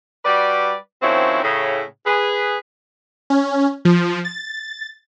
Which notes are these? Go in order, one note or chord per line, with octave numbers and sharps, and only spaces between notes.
G3 F#4 B4 D5
D#3 F3 C4 C#4 E4 F#4
A2 C#3
G#4 B4
C#4
F3
A6